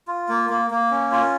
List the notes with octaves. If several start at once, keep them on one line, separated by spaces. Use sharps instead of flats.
F4
A#3
A#3
A#3
C#4
F4